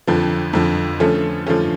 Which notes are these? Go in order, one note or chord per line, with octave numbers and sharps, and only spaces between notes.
F2 D3 F3
F2 D3 F3
D3 F3 A3 C#4
D3 F3 A3 C#4